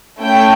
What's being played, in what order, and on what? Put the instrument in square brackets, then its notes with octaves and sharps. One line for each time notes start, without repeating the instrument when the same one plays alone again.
[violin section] A3 C#4 E4 G5